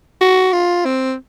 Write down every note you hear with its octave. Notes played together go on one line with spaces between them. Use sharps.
F#4
F4
C4